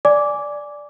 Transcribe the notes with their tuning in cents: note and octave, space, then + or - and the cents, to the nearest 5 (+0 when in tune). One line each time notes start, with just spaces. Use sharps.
D5 +0 G#5 +0 D6 -15